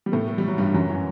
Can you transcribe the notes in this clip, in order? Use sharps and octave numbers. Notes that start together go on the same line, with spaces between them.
G3
A2 A3
A3
G3
F#3
G2 G3
F#2 F#3
E3